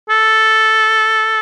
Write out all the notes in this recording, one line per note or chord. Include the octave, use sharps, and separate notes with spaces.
A4